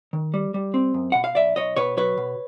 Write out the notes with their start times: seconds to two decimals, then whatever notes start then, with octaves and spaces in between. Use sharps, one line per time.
0.13 D#3
0.34 G3
0.54 G3
0.74 C4
0.94 F#2
1.12 B2 F#5
1.24 F5
1.35 B1 D5 E5
1.56 B1 C#5 D#5
1.76 B2 B4 C#5
1.97 F#3 B4 C#5
2.17 B2